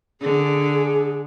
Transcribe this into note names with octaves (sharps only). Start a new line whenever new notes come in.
D3 G#4